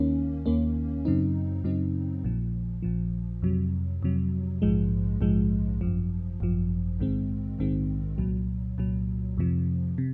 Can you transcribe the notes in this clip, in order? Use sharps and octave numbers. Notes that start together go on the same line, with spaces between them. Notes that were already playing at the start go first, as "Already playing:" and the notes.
Already playing: D#2 D#3 A#3 C#4
D#2 D#3 A#3 C#4
F#2 C#3 F#3 C4 D#4
F#2 C#3 F#3 C4 D#4
A#1 A#2 F3
A#1 A#2 F3
F2 C3 F#3
F2 C3 F#3
A#1 G#2 F3 G#3
A#1 G#2 F3 G#3
G#1 F#2 F3
G#1 F#2 F3
A#1 G#2 D#3 G#3 C4
A#1 G#2 D#3 G#3 C4
C2 A#2 F#3
C2 A#2 F#3
F2 C3 F3
C3